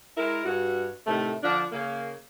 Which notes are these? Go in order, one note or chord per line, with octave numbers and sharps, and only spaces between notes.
G#3 E4 A#4
G2 F#4
A2 C3 D#3 A3
D3 F3 D4
C#3 A#3